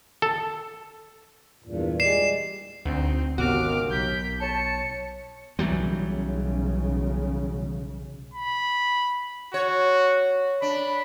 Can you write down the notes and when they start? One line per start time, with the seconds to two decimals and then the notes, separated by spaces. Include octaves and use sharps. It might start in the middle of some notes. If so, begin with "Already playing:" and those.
0.22 A4
1.64 E2 G2 A#2
2.00 G3 G#3 D5 C7 E7
2.86 D2 C4 D#4
3.38 G#1 D#2 C#3 B3 F#4 D6 F6
3.90 B1 G6 B6
4.41 C#5 A5 C#7
5.59 B1 C#3 E3 F#3 G3
8.34 B5
9.54 F#4 C#5
10.62 D4 B5